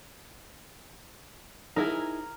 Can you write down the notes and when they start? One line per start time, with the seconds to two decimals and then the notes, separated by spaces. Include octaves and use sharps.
1.76 D#4 E4 G#4 A#4